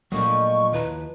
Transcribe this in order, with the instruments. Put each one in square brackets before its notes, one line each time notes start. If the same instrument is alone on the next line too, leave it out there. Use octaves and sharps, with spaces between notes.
[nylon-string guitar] A#2 A#3 D4 [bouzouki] F3 D#5 [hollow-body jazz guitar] F#3 A3 [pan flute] C#6
[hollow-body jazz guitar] D#2 E4 A#5 [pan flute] B4